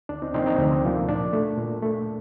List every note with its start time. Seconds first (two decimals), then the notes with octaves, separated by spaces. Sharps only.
0.09 D2 D4
0.22 C4 D#4
0.34 C3 F3 A#3 C4 D#4
0.46 C4 D#4
0.59 D2 D4
0.71 C4
0.84 C3 F3 A#3
1.09 A#2 D4
1.33 A3
1.58 A#2
1.82 A3